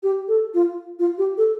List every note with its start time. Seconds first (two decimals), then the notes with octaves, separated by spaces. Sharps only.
0.03 G4
0.28 A4
0.54 F4
0.99 F4
1.18 G4
1.38 A4